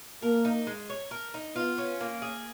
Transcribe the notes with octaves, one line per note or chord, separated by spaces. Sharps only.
A#3 A#4
D#4
G#3
C#5
A#4
D#4
B3 F4
C#4
A#3
G#4